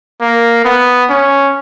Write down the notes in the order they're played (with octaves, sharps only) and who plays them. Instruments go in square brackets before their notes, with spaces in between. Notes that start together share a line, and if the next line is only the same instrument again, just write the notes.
[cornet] A#3
B3
C#4